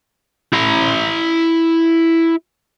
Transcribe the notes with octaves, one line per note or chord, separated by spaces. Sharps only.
E4 A#5